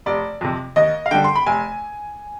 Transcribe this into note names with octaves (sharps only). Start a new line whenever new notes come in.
F1 D5
F2 C3
D#2 D#5
F5
D3 G3 G5
C6
B5
F1 G#5